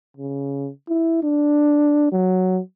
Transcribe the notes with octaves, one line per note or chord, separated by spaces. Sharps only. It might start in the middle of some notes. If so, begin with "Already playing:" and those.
C#3
E4
D4
F#3